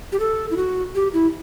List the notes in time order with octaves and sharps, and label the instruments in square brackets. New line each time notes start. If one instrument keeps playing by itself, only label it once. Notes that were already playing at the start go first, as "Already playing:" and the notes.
[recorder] G4
A4
E4
F#4
G4
E4